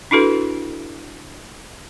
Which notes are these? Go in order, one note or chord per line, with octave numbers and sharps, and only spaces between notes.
D4 E4 F#4 A4 B4